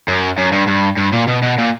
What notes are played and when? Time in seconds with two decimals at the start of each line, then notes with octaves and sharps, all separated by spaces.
0.08 F#2
0.38 F#2
0.53 G2
0.68 G2
0.98 G2
1.13 A#2
1.28 B2
1.43 B2
1.58 A#2